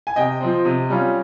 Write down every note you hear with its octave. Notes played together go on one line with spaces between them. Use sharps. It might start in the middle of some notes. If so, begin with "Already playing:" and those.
G#5
C3 D#5 G5
F3 C4
C3
G3 C#4 F4